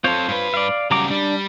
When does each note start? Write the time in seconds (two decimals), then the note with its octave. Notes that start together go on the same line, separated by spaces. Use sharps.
0.04 C4 F4 A4 C5 C#5
0.28 G2 B4
0.54 D5 F5
0.91 C#3 F#3 G3 A#5 D6
1.10 G3 D4